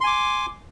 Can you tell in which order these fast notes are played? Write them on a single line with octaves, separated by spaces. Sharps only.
C6 G#5 D6